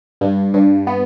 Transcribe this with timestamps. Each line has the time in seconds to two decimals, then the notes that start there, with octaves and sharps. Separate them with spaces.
0.21 G2
0.54 G2
0.87 B3